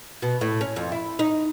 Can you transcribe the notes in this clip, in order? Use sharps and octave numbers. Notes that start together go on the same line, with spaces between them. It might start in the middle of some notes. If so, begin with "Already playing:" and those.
B2
A2
C#4
F2
E4
D#4